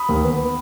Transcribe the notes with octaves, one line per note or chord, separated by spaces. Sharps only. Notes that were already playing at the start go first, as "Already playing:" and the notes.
Already playing: B5 D#6
D#2
B3